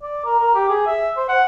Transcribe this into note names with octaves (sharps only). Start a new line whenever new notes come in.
D5
A#4
A#4
G4
G#4
E5
C5
F#5